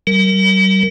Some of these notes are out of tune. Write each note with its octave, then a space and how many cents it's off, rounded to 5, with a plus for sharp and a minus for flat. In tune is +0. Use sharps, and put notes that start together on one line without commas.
G3 -45 A#4 -10